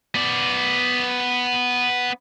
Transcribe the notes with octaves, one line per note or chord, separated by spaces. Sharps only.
B3 D5